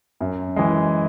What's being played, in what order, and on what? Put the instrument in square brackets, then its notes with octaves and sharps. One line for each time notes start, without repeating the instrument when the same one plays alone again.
[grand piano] F#2
E3 G#3